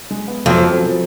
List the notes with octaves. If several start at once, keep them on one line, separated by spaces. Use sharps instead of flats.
G#3
B3
F2 F#3
F3
F3
F3